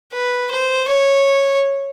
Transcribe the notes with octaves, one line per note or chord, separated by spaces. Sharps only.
B4
C5
C#5